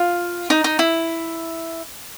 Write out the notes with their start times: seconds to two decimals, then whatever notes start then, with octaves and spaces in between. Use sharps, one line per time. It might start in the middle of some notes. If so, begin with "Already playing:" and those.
Already playing: F4
0.50 D#4
0.64 D#4
0.79 E4